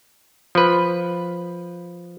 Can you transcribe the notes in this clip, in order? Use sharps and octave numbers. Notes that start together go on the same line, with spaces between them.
F3 B4